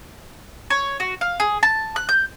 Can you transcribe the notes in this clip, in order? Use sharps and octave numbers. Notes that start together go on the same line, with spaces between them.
C#5
F#4
F5
G#4
A5
F#6
G6